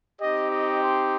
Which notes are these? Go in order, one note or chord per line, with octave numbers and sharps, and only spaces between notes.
C4 D#4 G4 D#5
D#5
C6